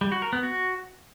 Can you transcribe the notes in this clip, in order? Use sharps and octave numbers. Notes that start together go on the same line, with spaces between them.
G3
F#4
A#4
B3
F#4